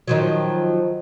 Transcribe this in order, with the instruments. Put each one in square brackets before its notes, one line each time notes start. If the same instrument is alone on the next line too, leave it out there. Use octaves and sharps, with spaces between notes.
[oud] D#3 F3 F#3